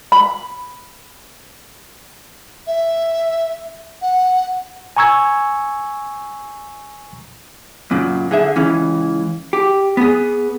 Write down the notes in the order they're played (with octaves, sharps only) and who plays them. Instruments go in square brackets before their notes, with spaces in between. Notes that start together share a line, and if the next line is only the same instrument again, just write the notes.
[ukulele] B5
[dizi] E5
F#5
[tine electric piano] G#5 A#5 C#6 E6 G#6
[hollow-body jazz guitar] F#2 A#2 C#3
D3 G#4 E5
C#2 E3 C#4
G4
B3 G#4